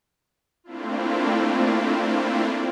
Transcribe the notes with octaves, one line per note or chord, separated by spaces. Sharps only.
A3 A#3 C4 D4 E4 F4